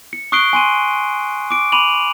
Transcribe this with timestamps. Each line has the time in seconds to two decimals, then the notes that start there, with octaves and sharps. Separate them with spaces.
0.13 C#7
0.32 C#6 D#6 F#6 C7 D7 G7
0.53 G#5 C6 D#7
1.51 D6 D7
1.72 B5 D6 D#7 F7 F#7